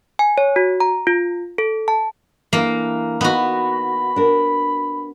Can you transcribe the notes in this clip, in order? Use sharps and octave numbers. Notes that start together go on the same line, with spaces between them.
G#5
C#5
F#4
A#5
F4
A4
A5
E3 A3 A#3 D4
B3 D#4 F#4 B5
D4 A#4